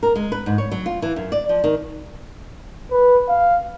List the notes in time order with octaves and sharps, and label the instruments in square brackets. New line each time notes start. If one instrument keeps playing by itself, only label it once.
[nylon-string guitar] A#4
G#3
B4
G#2
C#5
F#3
F4
E3
F#2
D5
F3
D#3
[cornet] B4
F5